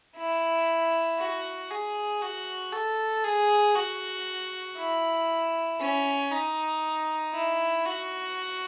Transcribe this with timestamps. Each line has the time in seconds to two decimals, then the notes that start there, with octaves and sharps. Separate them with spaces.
0.16 E4
1.19 F#4
1.71 G#4
2.22 F#4
2.72 A4
3.24 G#4
3.75 F#4
4.78 E4
5.80 C#4
6.31 D#4
7.34 E4
7.85 F#4